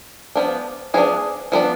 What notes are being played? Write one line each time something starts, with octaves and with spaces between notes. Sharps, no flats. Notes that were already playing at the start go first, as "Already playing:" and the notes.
F3 B3 D4
F3 B3 D4 G#4
F3 B3 D4